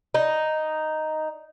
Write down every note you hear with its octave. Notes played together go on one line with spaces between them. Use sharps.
D#4